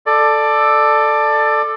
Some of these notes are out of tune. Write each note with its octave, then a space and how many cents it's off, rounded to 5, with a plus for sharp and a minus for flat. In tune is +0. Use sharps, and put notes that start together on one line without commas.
A4 +0 D5 +15